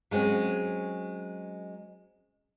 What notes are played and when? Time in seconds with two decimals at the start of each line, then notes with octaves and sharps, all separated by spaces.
0.11 F#3 G#3 C4 C#4